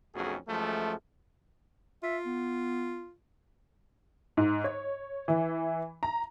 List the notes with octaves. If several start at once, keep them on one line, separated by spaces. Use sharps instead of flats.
B1 F2 A3 C#4 F#4 G#4
F#2 F3 G#3 A3
F4 E5
B3
G#2
C#5
E3
A#5